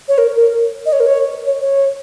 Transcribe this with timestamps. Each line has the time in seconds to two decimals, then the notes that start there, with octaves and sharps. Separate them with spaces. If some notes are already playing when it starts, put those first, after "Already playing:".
0.08 C#5
0.18 A#4
0.36 A#4
0.86 D#5
0.93 C#5
1.00 A#4
1.06 C#5
1.47 C#5
1.62 C#5